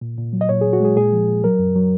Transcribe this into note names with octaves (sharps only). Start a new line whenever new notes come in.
A#2
A#2
F#3
D#5
A#2 C#5
A#2 G#4
F#4
G#3 G#4
A#2 G#4
F3
A#2
F#3 A#4
F#2
F#3